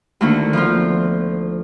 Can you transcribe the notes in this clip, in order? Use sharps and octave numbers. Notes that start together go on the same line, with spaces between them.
D2 D3 D#3 A#3 E4
F3 B3 F4